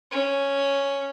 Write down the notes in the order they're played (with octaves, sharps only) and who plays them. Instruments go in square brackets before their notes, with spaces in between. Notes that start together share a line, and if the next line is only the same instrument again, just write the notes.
[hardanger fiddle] C#4